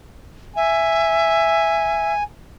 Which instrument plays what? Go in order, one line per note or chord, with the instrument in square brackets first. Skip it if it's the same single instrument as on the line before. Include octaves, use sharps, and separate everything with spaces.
[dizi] E5 [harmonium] G#5